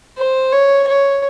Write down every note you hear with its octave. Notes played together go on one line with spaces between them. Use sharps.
C5
C#5
C#5